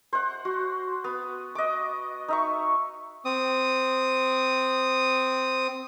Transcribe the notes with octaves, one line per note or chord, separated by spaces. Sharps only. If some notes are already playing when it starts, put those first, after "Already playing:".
C5 F#5
F#4
B3
D#5 D6
D#4 E5 C#6
C4 D#6